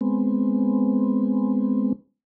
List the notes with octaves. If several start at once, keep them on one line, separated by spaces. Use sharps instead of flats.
G#3 B3 C4